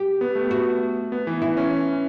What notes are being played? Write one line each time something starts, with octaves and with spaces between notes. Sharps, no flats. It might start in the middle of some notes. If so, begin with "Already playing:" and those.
Already playing: G4
B3
A3
F#4
B3
E3
E3 E4
C#4